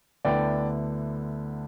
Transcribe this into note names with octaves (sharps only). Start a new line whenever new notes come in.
D2 D3 B3 E4 D5 G5